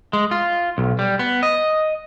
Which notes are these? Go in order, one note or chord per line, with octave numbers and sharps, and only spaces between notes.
G#3
F4
B1
G3
B3
D#5